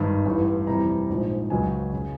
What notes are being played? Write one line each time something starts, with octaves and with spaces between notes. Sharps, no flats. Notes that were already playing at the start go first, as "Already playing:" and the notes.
Already playing: G#1 G2 D#3 A5
A1 G2 E3 G3
F2 C3 E3 G3 A#5
A#1 G#2 F3
C#2 C#3 F#3 G#5
C#3